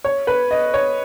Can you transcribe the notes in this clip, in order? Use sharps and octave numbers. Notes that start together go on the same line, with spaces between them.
C#5
B4
D#5
C#5